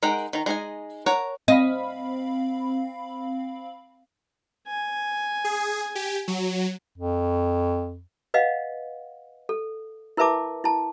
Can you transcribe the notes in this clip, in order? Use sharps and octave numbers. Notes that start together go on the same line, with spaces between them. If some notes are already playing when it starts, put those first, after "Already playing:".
G#3 D#4 A#4 F#5 G5
D#3 A#5
G#3 D#4 D#5 G#5
A#4 C#5 F#5 A5 A#5
C4 D#5 F5 B5
G#5
G#4
G4
F#3
F2
B4 D#5 F5 F#5
A4
E4 A#4 B4 E5 A5 D6
E4 A5